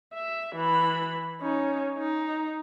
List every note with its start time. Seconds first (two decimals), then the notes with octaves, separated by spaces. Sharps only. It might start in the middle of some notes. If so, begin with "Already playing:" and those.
0.14 E5
0.56 E3 B5
1.41 C#4 D#4
1.98 D#4